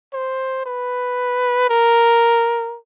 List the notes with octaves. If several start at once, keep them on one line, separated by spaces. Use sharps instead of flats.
C5
B4
A#4